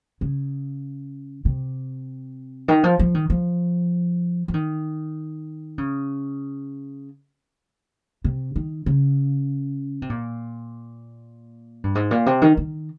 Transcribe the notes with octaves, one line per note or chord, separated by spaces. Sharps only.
C#3
C3
D#3
F3
F3
D#3
F3
F3
D#3
C#3
C3
D#3
C#3
C3
A#2
G2
G#2
A#2
C3
D#3
D#3